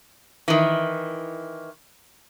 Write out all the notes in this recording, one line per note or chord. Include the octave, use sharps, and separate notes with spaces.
D#3 E3